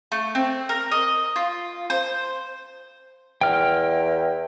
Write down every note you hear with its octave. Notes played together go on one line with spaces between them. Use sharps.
A3
C4
A#4
D#5
F4
C5
E2 G5 F6